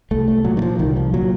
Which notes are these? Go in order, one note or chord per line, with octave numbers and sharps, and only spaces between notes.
C2 A3
A3
A#2 F#3
D#3
F3
C2 D#3
F3
A#2 F#3